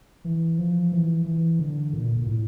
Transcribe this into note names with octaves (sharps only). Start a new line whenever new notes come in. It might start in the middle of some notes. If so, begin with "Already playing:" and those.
E3
F3
E3
E3
D3
A#2
A#2
A2